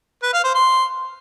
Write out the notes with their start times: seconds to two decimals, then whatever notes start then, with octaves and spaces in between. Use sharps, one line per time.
0.23 B4
0.34 F5
0.44 C5
0.55 C6